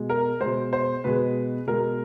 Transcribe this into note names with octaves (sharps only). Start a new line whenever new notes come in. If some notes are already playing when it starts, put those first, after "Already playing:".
Already playing: B2 G#3
A#4
G#3 C5
B2
C5
B2 G#3 B4
B2 G#3 A#4